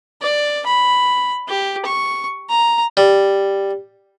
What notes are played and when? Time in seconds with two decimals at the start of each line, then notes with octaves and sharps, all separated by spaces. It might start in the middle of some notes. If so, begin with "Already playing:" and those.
0.22 D5
0.66 B5
1.48 G4
1.86 C#6
2.49 A#5
2.97 G3